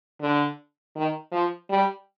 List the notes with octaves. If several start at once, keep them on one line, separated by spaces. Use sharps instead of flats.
D3
D#3
F3
G3